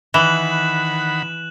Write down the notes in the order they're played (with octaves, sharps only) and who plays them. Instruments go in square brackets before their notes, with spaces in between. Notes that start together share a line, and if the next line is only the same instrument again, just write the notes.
[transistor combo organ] D#3 F#5 B5 [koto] E3 [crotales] F#6 E7 F#7